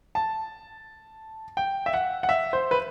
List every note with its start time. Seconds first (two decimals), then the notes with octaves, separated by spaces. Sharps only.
0.15 A5
1.57 G5
1.86 E5
1.94 F#5
2.23 F#5
2.29 E5
2.53 C5
2.71 B4